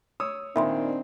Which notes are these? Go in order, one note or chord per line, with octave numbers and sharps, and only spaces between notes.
C#5 D#6 E6
A#2 D#3 C4 D4 D#4 E5 B5 C6